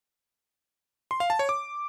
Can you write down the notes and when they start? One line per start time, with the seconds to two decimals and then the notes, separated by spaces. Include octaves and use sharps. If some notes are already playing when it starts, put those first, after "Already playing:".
1.11 C6
1.20 F5
1.30 A5
1.39 C#5
1.49 D6